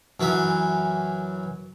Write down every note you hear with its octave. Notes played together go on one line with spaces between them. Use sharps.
F#2 E3 F#4 E5